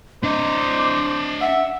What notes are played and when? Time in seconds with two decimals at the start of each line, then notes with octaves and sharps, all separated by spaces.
0.23 D4 C5 D#5 D6
1.41 E5 F#5